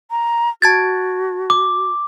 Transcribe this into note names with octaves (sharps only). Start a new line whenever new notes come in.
A#5
F#4 A5 G#6 A6
D6